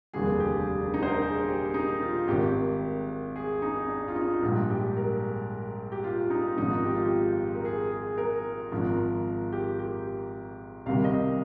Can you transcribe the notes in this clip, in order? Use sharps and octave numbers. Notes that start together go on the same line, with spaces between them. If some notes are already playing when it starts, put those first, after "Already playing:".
F1 D#2 D3 G3 G#4
G4
G#4
D4
D#4
C5
A#4
G#4
G4
D#4
F4
G#1 G#2 D#3 G4
G#4
D#4
D4
F4
D#4
A#1 G#2 G3
G4
A#4
G4
F4
D#4
G#1 G#2 F3 D#4
G4
F4
G4
A#4
G#4
G#4
A#4
G#1 G#2 F3
G4
G4
C2 C3 D#3 G3 F5
D#5